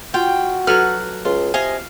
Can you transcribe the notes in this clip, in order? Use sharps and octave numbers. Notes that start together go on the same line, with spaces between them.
F4 F#4 G5
F#3 A4 B4 F6
C#2 F4
C3 D#5 F5 G#5